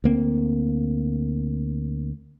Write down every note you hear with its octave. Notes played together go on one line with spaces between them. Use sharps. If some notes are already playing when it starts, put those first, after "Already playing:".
D2 A#3 C4